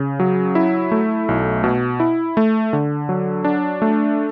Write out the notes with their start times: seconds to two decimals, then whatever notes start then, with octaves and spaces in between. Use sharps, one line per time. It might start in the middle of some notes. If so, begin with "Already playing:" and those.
Already playing: C#3
0.20 F#3
0.55 E4
0.92 A3
1.29 B1
1.64 B2
2.00 E4
2.37 A3
2.73 D3
3.09 F#3
3.44 D4
3.82 A3